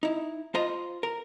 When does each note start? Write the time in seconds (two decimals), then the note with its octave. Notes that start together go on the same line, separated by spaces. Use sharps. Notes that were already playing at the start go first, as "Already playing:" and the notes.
0.03 D#4 E4
0.55 F4 C5 D#5 A#5
1.03 A#4